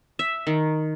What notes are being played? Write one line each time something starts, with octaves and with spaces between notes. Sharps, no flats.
E5
D#3